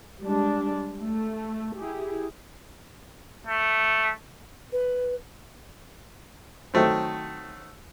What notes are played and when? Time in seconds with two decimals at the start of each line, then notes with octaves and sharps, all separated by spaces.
0.22 G3 G#3 D4
0.99 A3
1.77 E4 G4 G#4
3.47 A3
4.72 B4
6.74 D#3 F#3 A3 C4